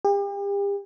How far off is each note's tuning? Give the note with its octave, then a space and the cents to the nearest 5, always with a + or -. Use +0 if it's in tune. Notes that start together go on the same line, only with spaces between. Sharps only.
G4 +40